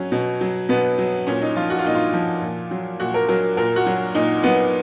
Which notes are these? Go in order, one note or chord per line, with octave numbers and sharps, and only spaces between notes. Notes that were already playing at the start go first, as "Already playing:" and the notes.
Already playing: F#3 C#4
B2
F#3
B2 B3
F#3
A#2 C#4
D#4
F3 F4
F#4
F4
A#2 D#4
F4
F3
A#2
F#3
A#2 F#4
A#4
F#3 A#4
A#2 A#4
F#4
F#3
A#2 D#4
F#3 B3